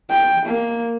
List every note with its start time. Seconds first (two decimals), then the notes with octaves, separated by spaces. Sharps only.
0.10 G5
0.45 A#3